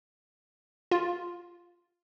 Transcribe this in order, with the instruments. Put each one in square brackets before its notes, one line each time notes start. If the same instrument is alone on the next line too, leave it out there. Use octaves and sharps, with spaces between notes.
[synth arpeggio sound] F4